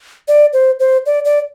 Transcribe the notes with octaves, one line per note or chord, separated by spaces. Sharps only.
D5
C5
C5
D5
D5